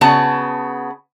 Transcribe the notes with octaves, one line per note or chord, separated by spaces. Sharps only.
C#3 B3 F#4 A5